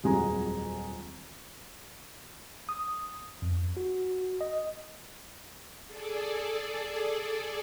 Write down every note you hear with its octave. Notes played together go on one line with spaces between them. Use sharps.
D#1 F2 F#3 G#3 G#5 A#5
D#6
F2
F#4
D#5
G#4 A4 D5